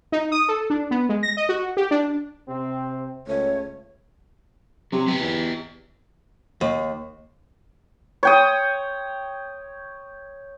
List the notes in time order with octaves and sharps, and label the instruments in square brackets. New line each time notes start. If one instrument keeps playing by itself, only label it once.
[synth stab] D#4
D#6
A4
D4
B3
G#3
A#6
D#5
F#4
G4
D4
[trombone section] C3 C4
[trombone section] C#2 A3 [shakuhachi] C#5
[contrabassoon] C3 [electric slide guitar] F#3
[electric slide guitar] B3 G4
[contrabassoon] E2
[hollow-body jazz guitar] D#2
[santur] C#5 G5 D#6